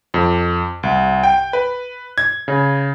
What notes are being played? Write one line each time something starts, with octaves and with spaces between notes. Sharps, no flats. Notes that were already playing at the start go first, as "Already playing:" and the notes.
F2
C2
G5
B4
G#6
C#3